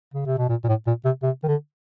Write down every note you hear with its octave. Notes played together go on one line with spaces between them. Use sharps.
C#3
C3
B2
A#2
A#2
A2
A#2
C3
C3
D#3
D3